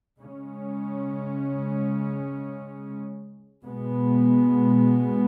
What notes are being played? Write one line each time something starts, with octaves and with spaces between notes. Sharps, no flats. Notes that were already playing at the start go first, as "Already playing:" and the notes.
C#3 G#3 C#4
B2 G#3 B3